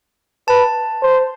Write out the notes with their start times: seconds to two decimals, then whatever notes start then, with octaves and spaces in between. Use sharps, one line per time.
0.48 B4 A5
1.02 C5